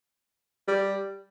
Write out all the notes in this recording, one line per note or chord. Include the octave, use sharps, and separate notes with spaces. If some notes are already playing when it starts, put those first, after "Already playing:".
G3